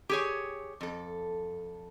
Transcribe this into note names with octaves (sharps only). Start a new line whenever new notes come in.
G4 G#4 C#5
F2 A4